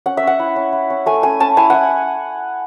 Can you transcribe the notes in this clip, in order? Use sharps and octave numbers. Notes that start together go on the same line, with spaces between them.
C#4 F#5
E5
C#4 F#5
E4
C#4
E4
C#4
A3 G#5
C#4 G#5
C#4 A5
E4 G#5
E4 F#5